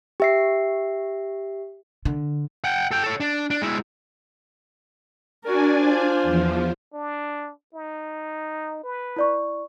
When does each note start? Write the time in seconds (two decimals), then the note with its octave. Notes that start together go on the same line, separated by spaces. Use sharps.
0.20 G4 E5 C7
2.05 D3
2.64 F#5 G5
2.91 A4 G5
3.03 A4 C#5
3.20 D4
3.50 D4
3.62 G#3 E4
5.43 D4 F#4 A#4 D5 G#5
5.80 F4 C5
6.23 E2 F3
6.94 D4
7.74 D#4
8.83 B4
9.16 E4 D5 C#6